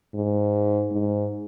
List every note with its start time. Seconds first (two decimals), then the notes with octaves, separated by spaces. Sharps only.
0.14 G#2
0.91 G#2